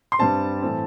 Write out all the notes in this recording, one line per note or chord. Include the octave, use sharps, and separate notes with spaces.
C6
G2 G3 C4 A5
A2 E3 A3 C4